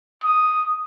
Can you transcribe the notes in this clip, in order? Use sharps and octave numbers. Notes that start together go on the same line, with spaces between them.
D#6